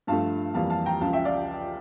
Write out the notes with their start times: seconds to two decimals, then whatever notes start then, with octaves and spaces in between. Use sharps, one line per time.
0.07 G2 F3 A3 F5 A5
0.54 F2 E3 G3 A#3 F5 A5
0.70 F5 A5
0.86 G5 A#5
1.01 C#2 C#3 F3 F5 A5
1.13 E5 G5
1.25 D5 F5